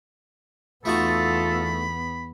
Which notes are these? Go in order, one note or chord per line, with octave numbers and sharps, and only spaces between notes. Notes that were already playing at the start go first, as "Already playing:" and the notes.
E2 A3 B3 D#4 F4 F#4 A4 B5